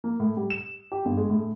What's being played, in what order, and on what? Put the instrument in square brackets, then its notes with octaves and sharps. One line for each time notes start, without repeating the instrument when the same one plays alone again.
[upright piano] A#3
A2
G3
E7
G4
G1
G#3
A2